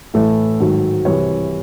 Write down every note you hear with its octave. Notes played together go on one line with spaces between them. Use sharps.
A2 E3 A3 A4
G#2 D#3 F#3
C2 C3 E3 C#5